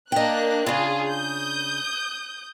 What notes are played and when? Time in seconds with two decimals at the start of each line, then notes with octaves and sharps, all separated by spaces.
0.12 A#3 D4 D#5 G5 F#6
0.66 C#3 D4 F4 G#4
1.09 D#6 G6